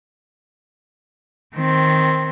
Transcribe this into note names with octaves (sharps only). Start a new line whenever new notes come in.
D#3 C4